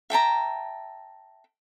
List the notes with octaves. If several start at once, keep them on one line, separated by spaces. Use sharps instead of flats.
E5 G5 A5 A#5